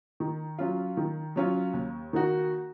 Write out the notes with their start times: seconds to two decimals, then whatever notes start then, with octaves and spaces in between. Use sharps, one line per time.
0.20 D#3
0.59 F#3 C#4 F4
0.97 D#3
1.36 F#3 C#4 F4
1.73 D#2
2.13 D#3 A#3 D#4 F#4